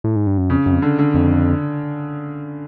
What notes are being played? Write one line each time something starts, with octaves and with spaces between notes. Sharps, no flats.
A2
G#2
G2
F#2
F2 C#3
F#2
F2
D3
D3
F2